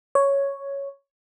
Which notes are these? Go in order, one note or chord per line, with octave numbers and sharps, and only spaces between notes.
C#5